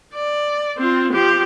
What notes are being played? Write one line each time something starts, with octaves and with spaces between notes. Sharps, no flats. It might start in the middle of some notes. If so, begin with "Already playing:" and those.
D5
C4 F4
F3 G4